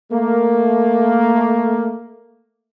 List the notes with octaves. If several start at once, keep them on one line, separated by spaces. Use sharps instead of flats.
A3 A#3